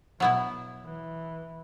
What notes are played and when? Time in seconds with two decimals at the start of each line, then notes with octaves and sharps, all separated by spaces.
0.20 B2 F#3 B3 E4
0.85 E3